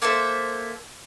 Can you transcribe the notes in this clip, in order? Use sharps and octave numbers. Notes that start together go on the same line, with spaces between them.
A#3 A4 C5 E5